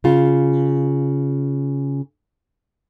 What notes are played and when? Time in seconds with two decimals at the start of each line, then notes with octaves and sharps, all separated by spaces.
0.04 C#3 F4